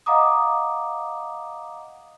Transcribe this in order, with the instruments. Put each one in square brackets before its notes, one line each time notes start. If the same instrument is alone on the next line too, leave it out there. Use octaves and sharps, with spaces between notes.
[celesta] D#5 F5 F#5 A#5 D6 D#6